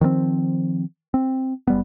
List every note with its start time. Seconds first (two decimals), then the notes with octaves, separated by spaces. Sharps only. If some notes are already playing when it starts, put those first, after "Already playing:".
0.01 D#3 F3 A#3 C4
1.14 C4
1.67 F#1 G3 B3